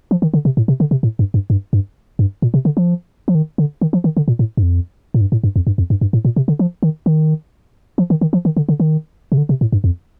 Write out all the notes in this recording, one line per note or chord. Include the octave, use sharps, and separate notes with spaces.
F3
D#3
D3
C3
A2
C3
D3
C3
A2
G2
G2
G2
G2
G2
A#2
C3
D3
F3
F3
D#3
D3
D#3
F3
D#3
D3
A#2
A2
G2
F2
A2
G2
A2
G2
F2
G2
F2
G2
G2
A2
A#2
C3
D3
F3
D#3
D#3
F3
D#3
D#3
F3
D#3
D3
D3
D#3
C3
D3
C3
A2
G2
F2